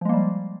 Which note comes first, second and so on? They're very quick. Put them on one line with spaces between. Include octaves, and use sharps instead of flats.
F3 G#3 A#3 G3